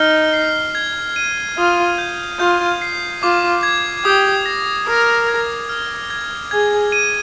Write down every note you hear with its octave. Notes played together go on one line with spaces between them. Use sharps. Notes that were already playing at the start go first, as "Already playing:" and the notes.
Already playing: D#4 F6
C7
G#6
D#7
F4 D#6
G6
F4 G6
C7
F4 D6
G#6
G4 D#6
A#6
A#4 D#6
G#6
F6
G#6
G#4 G#6
D#7